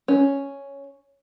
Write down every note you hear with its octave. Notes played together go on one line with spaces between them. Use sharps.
C#4